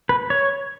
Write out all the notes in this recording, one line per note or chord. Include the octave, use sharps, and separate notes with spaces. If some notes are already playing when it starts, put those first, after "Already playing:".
B4
C#5